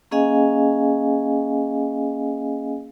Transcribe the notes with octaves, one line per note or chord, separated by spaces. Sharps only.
A#3 C#4 G#4 D#5 F5 G#5